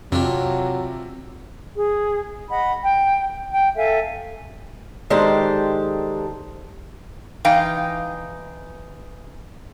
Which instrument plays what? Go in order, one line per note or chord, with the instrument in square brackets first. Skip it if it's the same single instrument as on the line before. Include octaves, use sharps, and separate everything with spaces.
[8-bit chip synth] F2 [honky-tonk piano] C3 [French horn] F#3 [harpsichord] D4 F4 G4
[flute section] G#4
D#5 F#5 B5
G5
G5
A4 E5 F5 G#5
[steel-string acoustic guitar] D#3 G#3 D4 G4 A4 C5
[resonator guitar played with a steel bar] E3 D#4 F5 G5